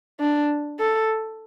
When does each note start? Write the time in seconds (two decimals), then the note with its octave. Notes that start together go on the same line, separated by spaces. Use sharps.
0.20 D4
0.79 A4